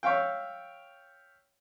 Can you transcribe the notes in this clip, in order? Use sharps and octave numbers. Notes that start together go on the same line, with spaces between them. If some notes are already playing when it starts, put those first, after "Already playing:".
C#5 E5 F5 G5